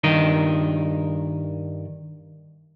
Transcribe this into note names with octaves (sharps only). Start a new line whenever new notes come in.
G2 D#3 A#4 D#5